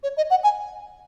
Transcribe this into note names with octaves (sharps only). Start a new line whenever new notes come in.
C#5
D#5
F#5
G#5